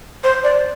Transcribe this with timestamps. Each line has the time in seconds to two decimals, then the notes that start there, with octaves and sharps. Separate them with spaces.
0.24 C5
0.44 D5